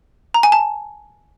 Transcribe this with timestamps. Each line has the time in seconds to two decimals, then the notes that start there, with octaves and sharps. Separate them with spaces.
0.34 A#5
0.43 G#5
0.52 A5